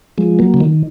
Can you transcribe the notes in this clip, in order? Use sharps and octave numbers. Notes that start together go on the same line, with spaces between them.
F3 G#3
F#3 A#3
C#3
D#3